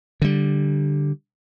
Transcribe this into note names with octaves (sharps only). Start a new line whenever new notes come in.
D3 G3